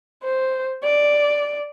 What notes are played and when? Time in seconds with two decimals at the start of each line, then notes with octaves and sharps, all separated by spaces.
0.23 C5
0.84 D5